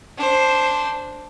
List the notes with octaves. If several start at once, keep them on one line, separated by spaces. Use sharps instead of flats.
D4 C5